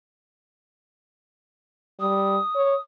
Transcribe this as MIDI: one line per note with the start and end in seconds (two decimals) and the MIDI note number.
2.00 2.38 55
2.00 2.81 87
2.55 2.75 73